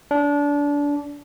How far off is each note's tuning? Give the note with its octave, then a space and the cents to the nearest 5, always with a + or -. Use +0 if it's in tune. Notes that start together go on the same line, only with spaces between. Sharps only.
D4 -25